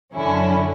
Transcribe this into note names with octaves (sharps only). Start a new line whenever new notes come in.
F#2 D3 F#3 C#4 E4